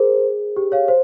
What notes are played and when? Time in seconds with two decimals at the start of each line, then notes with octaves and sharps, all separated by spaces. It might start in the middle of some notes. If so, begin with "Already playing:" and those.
Already playing: G#4 A#4 C5
0.56 G4
0.72 C#5 F5
0.88 C5